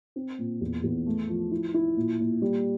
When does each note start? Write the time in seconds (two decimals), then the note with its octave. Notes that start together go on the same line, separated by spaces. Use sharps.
0.16 C4
0.38 A#2
0.61 E2
0.83 E2
1.06 A3
1.28 F3
1.51 E4
1.74 E4
1.97 A#2
2.20 A#2
2.42 G3